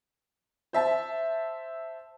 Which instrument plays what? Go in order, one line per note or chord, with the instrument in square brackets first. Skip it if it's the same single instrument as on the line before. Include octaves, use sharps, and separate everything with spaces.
[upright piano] C5 E5 A5